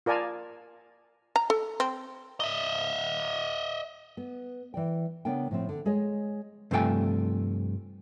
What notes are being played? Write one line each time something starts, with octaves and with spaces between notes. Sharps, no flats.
F4 A#4 D5 G#5 A5
A#5
A4
C4
D#5 E5
B3
E3 D5 G5
C#3 B3 D4 A#4 G5
A2 F3 C4
D3
G#3 G#4 C#5 D#5
G2 C3 F3 A3 G5 G#5